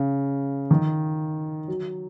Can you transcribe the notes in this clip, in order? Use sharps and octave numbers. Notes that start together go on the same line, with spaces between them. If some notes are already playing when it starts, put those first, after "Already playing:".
Already playing: C#3
D#3
F#3